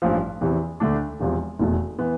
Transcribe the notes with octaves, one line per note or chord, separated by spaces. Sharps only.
A1 G2 F3
E2 C3 E3
D2 D3 A3 D4
E1 E2 C3 F3
F1 E2 B2 A3
E3 B3